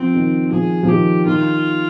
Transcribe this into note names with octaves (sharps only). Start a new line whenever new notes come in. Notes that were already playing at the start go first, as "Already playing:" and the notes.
Already playing: F3 C4
D#3
F3 G#4
F3
D#3 G4
D#3 F4